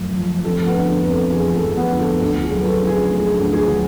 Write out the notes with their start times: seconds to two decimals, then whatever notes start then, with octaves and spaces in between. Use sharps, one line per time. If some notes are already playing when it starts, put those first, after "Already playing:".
Already playing: F#1 F#2 F3 A3
0.15 F3
0.44 F1 A4
0.60 A4
0.66 B3 B4
0.74 D3
0.88 A4
1.03 F2 B4
1.10 A4
1.32 F1 G#4
1.55 A4
1.62 F1
1.77 B3 B4
1.91 D3
1.99 A4
2.20 D2 A4
2.43 G#4
2.51 F#3
2.60 B4
2.66 A4
2.80 C#3
2.87 G#4
3.09 A3
3.20 G#4
3.31 A4
3.39 D2
3.53 G#4
3.68 F#3